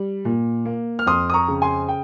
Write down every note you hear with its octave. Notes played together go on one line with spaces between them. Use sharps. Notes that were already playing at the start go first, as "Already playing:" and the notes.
Already playing: G3
A#2
A#3
F6
F2 C6 D#6
D#6
A#5 C#6
C#3
G#5 C6
G5